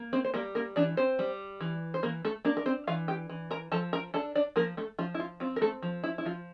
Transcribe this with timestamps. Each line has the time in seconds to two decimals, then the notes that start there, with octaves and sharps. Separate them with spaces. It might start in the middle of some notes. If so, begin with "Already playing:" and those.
Already playing: A#3
0.13 C4 C5
0.25 C5
0.34 G3 A#3 A#4
0.55 A#3 A#4
0.76 E3 D4 D5
0.97 C4 C5
1.19 G3
1.61 E3
1.94 C5
2.03 E3 A#3 A#4
2.25 A3 A4
2.45 A#3 D4 A#4
2.57 A#4
2.66 C4 C5
2.87 E3 F4 F5
3.08 G4 G5
3.29 E3
3.51 A#4 A#5
3.72 F3 A4 A5
3.93 A#4 A#5
4.14 D4 A4 A5
4.35 D4 D5
4.56 F3 A#3 A#4
4.77 A3 A4
4.99 F3 F4
5.14 E4
5.20 F4
5.40 C4 F4
5.56 A#4
5.62 A3 A4
5.82 F3
6.04 E4
6.18 E4
6.25 F3 F4